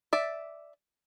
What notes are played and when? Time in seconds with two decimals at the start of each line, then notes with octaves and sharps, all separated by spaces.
0.13 D5 E5